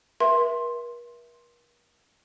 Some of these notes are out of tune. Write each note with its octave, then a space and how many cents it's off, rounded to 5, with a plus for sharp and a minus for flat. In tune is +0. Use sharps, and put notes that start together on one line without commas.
A#4 +45 E5 +0 C6 +10